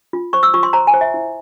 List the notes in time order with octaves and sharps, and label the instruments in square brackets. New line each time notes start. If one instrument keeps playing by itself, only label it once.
[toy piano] F4
C5 C#6
E6
F4 C#6
C6
C5 A#5
G#5
C5
E5
E4